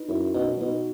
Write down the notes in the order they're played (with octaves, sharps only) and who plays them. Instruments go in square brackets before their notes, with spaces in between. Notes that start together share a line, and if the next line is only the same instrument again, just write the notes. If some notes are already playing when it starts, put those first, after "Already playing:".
Already playing: [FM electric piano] D#4 B4
[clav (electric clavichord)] F#2 [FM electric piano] E4
[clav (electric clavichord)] B2 [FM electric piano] D#4
[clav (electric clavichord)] B2 [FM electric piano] D#4